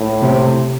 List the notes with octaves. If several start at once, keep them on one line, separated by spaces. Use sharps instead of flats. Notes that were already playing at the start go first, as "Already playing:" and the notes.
Already playing: A2
C3